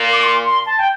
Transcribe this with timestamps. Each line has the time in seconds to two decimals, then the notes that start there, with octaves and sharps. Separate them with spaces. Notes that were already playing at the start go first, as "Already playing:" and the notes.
Already playing: A#2
0.13 D6
0.23 C6
0.45 C6
0.66 A5
0.79 G5